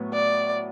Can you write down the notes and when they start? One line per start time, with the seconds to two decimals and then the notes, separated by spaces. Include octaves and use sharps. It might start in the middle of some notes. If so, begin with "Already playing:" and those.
Already playing: A2 F#3 B3
0.14 D5